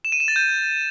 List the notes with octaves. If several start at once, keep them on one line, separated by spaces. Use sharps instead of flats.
E7
D#7
E7
A6
G6